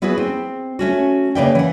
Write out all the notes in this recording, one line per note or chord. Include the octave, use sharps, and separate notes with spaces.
B3 E4 F#4 G#4 B4
C4
A3 C#4 F#4
C#3 A#3 B4 D5 E5 G5
E3 F#5